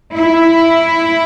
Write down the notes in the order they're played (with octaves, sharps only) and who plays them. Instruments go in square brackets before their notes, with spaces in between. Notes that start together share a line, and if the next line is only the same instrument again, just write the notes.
[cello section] E4